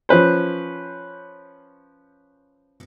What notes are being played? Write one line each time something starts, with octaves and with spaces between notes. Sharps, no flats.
F3 C#4 B4 C5